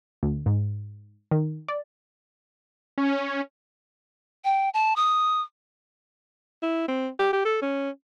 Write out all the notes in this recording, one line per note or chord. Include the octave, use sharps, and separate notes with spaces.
D2
G#2
D#3
D5
C#4
G5
A5
D#6
E4
C4
G4
G4
A4
C#4